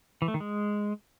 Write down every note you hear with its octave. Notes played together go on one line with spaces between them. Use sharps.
E3
A3
D#3
G#3